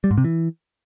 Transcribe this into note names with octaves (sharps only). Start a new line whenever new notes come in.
G3
G#2
C3
E3